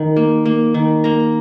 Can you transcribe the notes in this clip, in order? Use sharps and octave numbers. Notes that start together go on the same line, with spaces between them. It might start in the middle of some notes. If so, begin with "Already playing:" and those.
Already playing: D#3
A#3
A#3
D#3
A#3 A#5